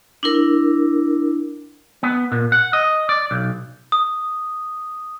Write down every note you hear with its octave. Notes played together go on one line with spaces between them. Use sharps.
D4 E4 A#4
B3
A#2
F#5
D#5
D5
B1
D#6